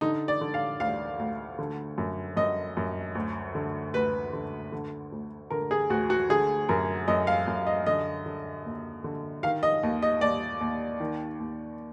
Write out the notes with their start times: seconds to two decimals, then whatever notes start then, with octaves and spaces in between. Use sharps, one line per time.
0.01 D3 D#4
0.28 D5
0.41 D3
0.54 F5
0.80 D2 F5
1.19 D2
1.59 D3
1.98 F#2
2.37 F#2 D#5
2.77 F#2
3.15 D2
3.55 D3
3.94 D2 B4
4.33 D3
4.72 D3
5.12 D2
5.50 D3 A#4
5.71 G#4
5.90 D2 F#4
6.10 F#4
6.29 D3 G#4
6.69 F#2 A#4
7.08 F#2 D#5
7.27 F5
7.48 F#2
7.67 D#5
7.86 D3 D#5
8.26 D3
8.65 D#2
9.04 D3
9.43 D#3 F5
9.63 D#5
9.83 D#2
10.02 D#5
10.21 D#2 D5
10.61 D#2
11.00 D#3
11.40 D#2